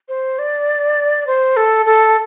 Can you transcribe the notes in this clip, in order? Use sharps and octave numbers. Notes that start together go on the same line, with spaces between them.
C5
D5
C5
A4
A4